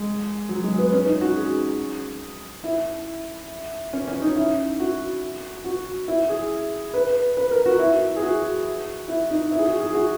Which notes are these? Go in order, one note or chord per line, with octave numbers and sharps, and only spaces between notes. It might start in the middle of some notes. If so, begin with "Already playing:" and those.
Already playing: G#3
F#3
G#3
B3
C#4
D#4
F#4
G#4
E4
C#4
C#4
D#4
E4
F#4
F#4
E4
G#4
B4
B4
A#4
F#4
E4
G#4
F#4
E4
D#4
E4
G#4
F#4
G#4
F#4